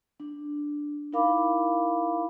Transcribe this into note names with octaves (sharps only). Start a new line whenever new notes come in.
D4
D#4 E4 A#4 F5 B5 D6